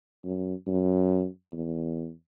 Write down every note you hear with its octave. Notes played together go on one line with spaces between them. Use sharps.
F#2
F#2
E2